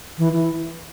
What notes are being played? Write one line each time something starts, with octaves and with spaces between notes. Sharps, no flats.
E3
E3